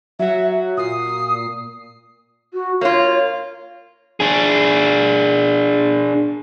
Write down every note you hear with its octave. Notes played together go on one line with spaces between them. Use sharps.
F#3 F#4 E5
A#2 D#6 C7
F#4
A#3 F4 C#5
D4 G#4